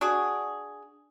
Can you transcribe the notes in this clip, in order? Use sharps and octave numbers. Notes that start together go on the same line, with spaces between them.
D4 F#4 G#4